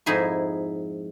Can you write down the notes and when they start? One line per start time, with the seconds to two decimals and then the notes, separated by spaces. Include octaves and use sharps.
0.06 F2 G#2 D#4 E4 G#4 E5